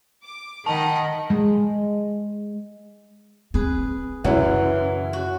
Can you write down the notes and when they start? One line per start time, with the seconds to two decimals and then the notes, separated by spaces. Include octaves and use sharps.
0.23 D6
0.66 D#3 D#5 F#5 A5 B5
1.30 G#3
3.54 C4 G#4 B4
4.24 F#2 C#3 E3 E4 C#5 F#5
5.13 F#4